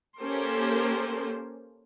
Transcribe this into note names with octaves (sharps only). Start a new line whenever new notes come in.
A#3 C#4 G4 A4 A#4 C5